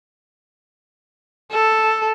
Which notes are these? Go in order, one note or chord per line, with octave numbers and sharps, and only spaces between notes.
A4